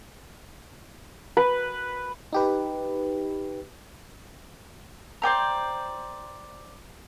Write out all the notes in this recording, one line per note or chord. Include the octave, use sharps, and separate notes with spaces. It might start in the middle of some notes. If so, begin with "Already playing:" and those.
B4
D#4 G4 B4
C5 D5 G5 A#5